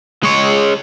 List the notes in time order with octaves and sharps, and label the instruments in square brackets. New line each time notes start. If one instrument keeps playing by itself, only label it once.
[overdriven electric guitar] G#3 C#5